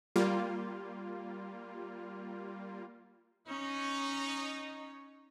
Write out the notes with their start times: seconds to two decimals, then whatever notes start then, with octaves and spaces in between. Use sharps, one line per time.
0.16 G3 A#3 F4
3.48 C#4 D#4 C#5